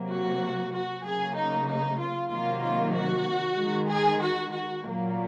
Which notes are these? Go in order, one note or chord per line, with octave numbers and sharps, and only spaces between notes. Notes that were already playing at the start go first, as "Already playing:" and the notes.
Already playing: C3 F#3 A#3
F#4
F#4
C#3 F#3 A#3 G#4
D#4
D#4
F4
C3 D#3 F#3 A#3 F4
F4
F#4
D#3 G#3
G#4
F#4
F#4
A#2 F#3 A#3